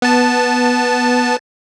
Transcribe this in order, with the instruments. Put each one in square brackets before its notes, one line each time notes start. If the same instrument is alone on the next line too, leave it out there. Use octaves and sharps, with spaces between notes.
[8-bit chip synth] B3 A5